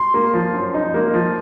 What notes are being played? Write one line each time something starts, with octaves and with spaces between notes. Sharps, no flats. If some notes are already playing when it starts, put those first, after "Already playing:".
Already playing: C6
A#3
F3
F#2
D#4
A#3
F3